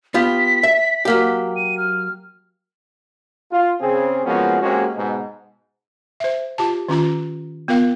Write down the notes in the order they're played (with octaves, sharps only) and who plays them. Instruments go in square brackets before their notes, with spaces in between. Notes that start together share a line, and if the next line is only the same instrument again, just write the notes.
[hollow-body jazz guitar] B3 F4 G4 [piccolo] B6
[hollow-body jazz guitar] E5
F#3 A#3 G4
[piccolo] D#7
F6
[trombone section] F4
C#3 C4 G#4
F3 G#3 A#3 B3 C#4 F#4
G#3 A#3 C4 C#4 F#4 G4
G#2 B2
[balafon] C5 E5
F4 G4 A5
D#3 C#4 F4 A#5
B3 F4 A#4 F5 G5